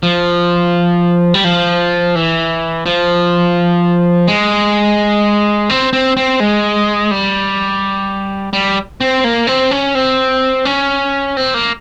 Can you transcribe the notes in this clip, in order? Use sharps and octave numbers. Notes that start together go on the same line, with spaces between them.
F3
G3
F3
E3
F3
G#3
C4
C4
C4
G#3
G3
G3
C4
A#3
C4
C#4
C4
C#4
C4
A#3